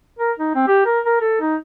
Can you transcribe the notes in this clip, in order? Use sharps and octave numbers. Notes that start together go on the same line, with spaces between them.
A#4
D#4
C4
G4
A#4
A#4
A4
D#4